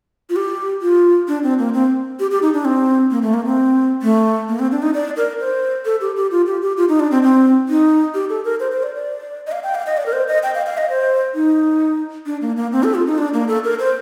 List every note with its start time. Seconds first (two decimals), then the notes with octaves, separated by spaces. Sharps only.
0.30 F4
0.36 G4
0.82 F4
1.28 D4
1.43 C4
1.59 A#3
1.74 C4
2.19 G4
2.31 G4
2.42 D#4
2.53 D4
2.65 C4
3.11 A#3
3.22 A3
3.34 A#3
3.45 C4
4.02 A3
4.49 A#3
4.59 C4
4.71 D4
4.82 D#4
4.94 D5
5.17 A#4
5.40 C5
5.85 A4
6.01 G4
6.16 G4
6.31 F4
6.47 G4
6.62 G4
6.77 F4
6.89 D#4
7.00 D4
7.11 C4
7.23 C4
7.69 D#4
8.14 G4
8.30 A4
8.45 A#4
8.60 C5
8.72 C5
8.83 D5
8.95 D5
9.47 D#5
9.52 F5
9.64 G5
9.75 F5
9.86 D#5
9.97 D5
10.06 A#4
10.13 C5
10.28 D#5
10.43 G5
10.55 F5
10.66 F5
10.78 D#5
10.89 C5
11.35 D#4
12.26 D4
12.41 A#3
12.57 A#3
12.72 C4
12.84 A4
12.95 F4
13.07 D#4
13.18 D4
13.34 A#3
13.48 A4
13.64 A#4
13.79 C5